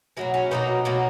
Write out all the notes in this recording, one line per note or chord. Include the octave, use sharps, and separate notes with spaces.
B2 F#3 A#3 E4 G#4
C#4 E4
B2 F#3 A#3 B3 D#4
B2 F#3 A#3